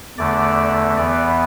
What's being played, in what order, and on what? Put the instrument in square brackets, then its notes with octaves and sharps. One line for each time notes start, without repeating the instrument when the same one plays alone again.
[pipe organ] E2 D3 A3 D5
E2 E3 B3 D5